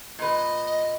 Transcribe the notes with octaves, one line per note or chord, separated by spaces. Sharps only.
A#2 B4 D#5